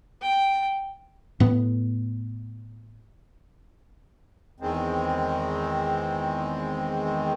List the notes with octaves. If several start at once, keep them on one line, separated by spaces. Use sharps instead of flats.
G5
A2 B3
E2 D#3 G#3 C4